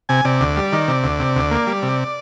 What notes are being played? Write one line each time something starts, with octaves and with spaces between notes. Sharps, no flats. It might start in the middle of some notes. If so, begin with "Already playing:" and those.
C3 G#5
C3 D5
D2
G3
D#3
C3
D2
C3
D2
A#3
G3
C3